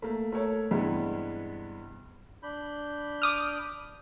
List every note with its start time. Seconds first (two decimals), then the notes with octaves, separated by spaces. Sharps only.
0.02 A3 A#3
0.32 A3 A4 A#4 C#5
0.71 G2 C3 E3 G3 G#3 B3
2.43 D4 B5 G6
3.22 D6 D#6 F6